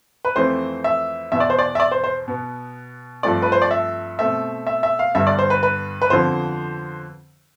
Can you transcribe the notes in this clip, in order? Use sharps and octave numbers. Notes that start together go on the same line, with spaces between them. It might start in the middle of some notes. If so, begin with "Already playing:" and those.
B4
F2 E3 A3 C4 C5
E5
E2 B2 B3 E5
D5
C5
D5
E5
D5
C5
C5
B2 B3
G2 F3 A3 C4 D5
B4
C5
D5
E5
B2 A3 C4 E5
E5
E5
F5
G2 D3 G3 B3 E5
D5
C5
B4
B4
B4
F2 D3 F3 B3 C5